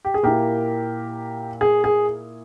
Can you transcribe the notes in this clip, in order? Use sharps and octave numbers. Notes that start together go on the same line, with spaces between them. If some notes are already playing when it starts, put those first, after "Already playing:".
G4
G#4
A#2 A#3 E4 G4 A#4
G#4
G#4